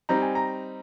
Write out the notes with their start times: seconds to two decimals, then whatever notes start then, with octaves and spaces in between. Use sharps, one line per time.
0.09 G3 C4 D#4 A#5
0.22 G#5
0.35 A#5